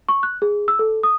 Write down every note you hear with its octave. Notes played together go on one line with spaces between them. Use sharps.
C#6
F#6
G#4
E6
A4
D#6